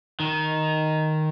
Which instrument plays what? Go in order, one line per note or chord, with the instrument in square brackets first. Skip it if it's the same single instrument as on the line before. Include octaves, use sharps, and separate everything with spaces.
[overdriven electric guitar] D#3